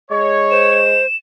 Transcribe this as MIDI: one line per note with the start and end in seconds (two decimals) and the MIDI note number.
0.11 1.00 56
0.11 0.78 73
0.51 1.06 72
0.51 1.16 100